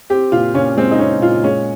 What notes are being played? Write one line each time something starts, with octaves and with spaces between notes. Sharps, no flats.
C4 G4
A#2 F4
A#2 C#4
G#3 C4
D#4
C4 C#4
A#2 F4
G#3 C#4